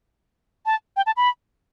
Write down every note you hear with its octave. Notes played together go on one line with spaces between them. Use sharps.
A5
G5
A5
B5